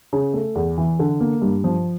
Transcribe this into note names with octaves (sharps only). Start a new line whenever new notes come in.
C#3
A3
E2
E3
D3
A#3
G2
F3